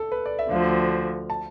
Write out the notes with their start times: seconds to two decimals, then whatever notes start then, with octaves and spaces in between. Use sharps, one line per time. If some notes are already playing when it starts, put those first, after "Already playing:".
Already playing: A4
0.12 B4
0.26 D5
0.39 E5
0.51 D2 D3 F3 F5
1.30 A5